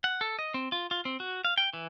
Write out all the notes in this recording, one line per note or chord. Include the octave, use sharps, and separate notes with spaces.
F#5
A4
D#5
C4
F4
F4
C4
F#4
F5
G5
E3